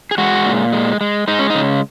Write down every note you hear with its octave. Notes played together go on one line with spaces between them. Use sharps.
G#4
G#3 F#4
A#2
G#3
G#3
G#3 D#4
C#4
D#4
C#3